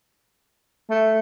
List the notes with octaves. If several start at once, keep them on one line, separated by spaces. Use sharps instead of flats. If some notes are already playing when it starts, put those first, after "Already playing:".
A3